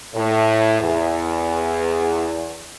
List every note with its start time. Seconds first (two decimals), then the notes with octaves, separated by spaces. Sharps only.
0.15 A2
0.81 E2